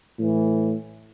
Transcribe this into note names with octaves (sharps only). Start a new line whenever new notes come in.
A2 E3